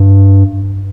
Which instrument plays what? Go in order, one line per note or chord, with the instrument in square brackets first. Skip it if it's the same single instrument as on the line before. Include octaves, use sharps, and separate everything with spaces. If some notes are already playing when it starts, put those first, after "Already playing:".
Already playing: [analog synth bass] G2